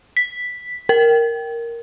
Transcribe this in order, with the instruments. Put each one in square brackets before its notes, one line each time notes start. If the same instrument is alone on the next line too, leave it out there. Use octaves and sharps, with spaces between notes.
[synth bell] B6
A#4